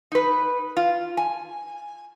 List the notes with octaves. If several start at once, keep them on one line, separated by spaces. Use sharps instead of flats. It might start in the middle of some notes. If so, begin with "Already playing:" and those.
D#4 B4
F4
G#5